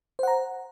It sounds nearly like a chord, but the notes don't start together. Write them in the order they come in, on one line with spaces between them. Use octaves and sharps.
C5 F#5 A#5